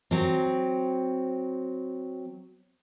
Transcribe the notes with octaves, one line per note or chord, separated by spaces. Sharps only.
F#3 C4